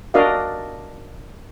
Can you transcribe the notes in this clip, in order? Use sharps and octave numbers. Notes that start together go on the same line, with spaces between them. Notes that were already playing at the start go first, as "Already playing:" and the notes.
D4 F#4 A#4 D5 D#5 F5